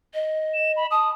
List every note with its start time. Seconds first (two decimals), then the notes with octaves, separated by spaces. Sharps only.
0.14 D#5
0.54 E7
0.77 B5
0.91 A5 D#6